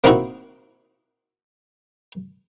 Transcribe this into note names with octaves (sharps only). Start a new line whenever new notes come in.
A#3 C4 D#4 E4 F#4